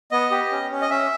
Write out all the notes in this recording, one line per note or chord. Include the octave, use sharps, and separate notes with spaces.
B3 D#5
G4
C#4
C#4
D#5
C#4 E5